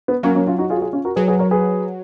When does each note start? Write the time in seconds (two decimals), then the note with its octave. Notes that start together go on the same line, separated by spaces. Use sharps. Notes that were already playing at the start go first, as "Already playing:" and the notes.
0.08 B3
0.23 F#3 A#3 C#4
0.35 A#3 C#4
0.47 C#4 F4
0.58 D#4 F#4
0.70 F4 G#4
0.76 F#4
0.82 F4 G#4
0.93 C#4 F4
1.05 F#4 A#4
1.16 F#3 G#4 B4
1.28 G#4 B4
1.39 A#4 C#5
1.51 G#4 B4